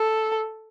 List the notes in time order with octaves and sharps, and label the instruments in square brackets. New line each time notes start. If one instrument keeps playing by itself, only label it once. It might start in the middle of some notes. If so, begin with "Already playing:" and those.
Already playing: [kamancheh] A4